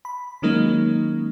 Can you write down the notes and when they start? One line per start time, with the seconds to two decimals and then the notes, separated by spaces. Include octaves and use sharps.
0.05 B5
0.42 D#3 F#3 G#3 A#3 C#4 D#4